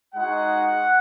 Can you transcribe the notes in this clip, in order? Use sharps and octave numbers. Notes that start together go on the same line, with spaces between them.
G#3 D#4 F#4 F#5